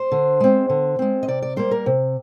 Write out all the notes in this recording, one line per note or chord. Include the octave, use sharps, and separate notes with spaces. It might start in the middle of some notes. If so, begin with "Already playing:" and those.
Already playing: C5
D3
G#3 C4
D3
G#3 C4
D#5
C3 D5
D5
G3 A#3 C5
A#4
C3